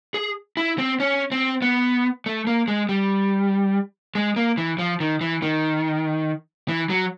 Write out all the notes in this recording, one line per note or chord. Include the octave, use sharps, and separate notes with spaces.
G#4
E4
C4
C#4
C4
B3
A3
A#3
G#3
G3
G#3
A#3
E3
F3
D#3
E3
D#3
E3
F#3